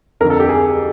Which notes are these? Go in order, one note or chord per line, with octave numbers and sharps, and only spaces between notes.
F2 D3 A#4
A4
G4
G#4